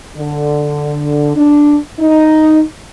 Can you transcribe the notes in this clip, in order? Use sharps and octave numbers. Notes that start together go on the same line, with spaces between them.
D3
D4
D#4